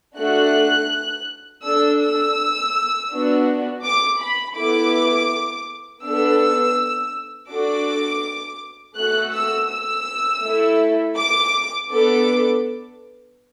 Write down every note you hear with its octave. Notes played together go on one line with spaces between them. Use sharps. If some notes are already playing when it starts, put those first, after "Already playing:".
A3 D4 F#4 A4 F#6
D4 A4 E6
E6
B3 D4 F#4
D6
B5
B3 E4 A4 D6
B3 D4 A4 E6
D4 F#4 A4 D6
A3 F#4 A4 F#6
E6
E6
A3 E4 A4
D6
B3 D4 A4 D6